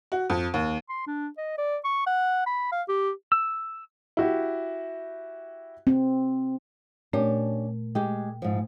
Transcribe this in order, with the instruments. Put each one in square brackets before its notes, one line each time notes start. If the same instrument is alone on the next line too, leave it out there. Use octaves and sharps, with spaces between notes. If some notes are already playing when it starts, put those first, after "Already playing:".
[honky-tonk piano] F#4
F2
D#2
[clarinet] C6
D4
D#5
D5
C#6
F#5
B5
F5
G4
[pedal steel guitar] E6
[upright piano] E4 F#4 G4
[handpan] C4
[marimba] A#2 A3 [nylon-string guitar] C#4 D4 G4
[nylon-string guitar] G#3 G4 [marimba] G5
[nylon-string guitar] G#2 F3